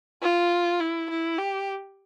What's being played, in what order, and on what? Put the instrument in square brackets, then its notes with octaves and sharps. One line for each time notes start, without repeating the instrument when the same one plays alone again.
[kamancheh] F4
E4
E4
G4